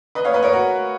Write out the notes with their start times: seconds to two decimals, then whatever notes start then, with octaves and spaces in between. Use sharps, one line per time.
0.15 B4 D#5
0.25 C#5 F5
0.33 B4 D#5
0.43 A#4 C#5
0.53 F#4 A#4